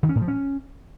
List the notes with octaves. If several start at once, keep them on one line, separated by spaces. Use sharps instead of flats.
D#3
C#4
A2
F3
C#4